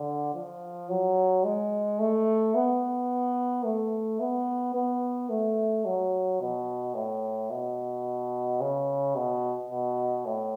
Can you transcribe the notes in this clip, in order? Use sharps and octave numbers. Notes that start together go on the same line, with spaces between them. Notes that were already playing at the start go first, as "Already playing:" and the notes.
Already playing: D3
F3
F#3
G#3
A3
B3
A3
B3
B3
A3
F#3
B2
A2
B2
C#3
B2
B2
A2